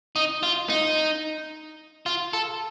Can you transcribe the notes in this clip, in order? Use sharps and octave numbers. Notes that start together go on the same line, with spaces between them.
D#4
F4
D#4
F4
A4